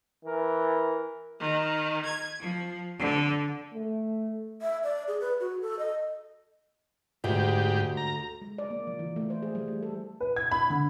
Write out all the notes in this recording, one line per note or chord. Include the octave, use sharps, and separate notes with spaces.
E3 A#4
D#3
G#6
F3
D3
A3
E5
D5
G#4
B4
F#4
A4
D#5
D2 G#2 G4
A#5
G#3
D5
A#3
F3
E3
A3
C5
G#4
G3
A3
A4
B4
G#6
B5
D3